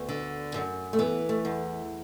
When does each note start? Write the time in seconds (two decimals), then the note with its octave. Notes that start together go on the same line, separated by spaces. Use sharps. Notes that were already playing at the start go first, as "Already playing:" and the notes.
Already playing: D2 B3
0.09 D3
0.54 F#2
0.93 A3
0.99 E3 B3
1.29 A3
1.45 E2